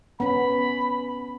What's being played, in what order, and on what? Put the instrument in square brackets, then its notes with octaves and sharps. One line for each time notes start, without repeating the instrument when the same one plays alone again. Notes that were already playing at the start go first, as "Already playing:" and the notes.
[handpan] B3 C#4 [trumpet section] B5